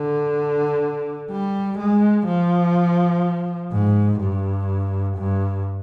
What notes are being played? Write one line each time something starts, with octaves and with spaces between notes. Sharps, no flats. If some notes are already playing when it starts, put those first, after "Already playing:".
Already playing: D3
G3
G#3
F3
G#2
G2
G2